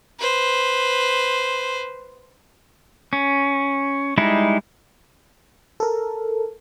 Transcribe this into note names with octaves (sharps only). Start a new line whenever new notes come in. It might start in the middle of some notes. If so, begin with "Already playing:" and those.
B4 C5
C#4
G3 G#3 D#4 E4
A4 A#4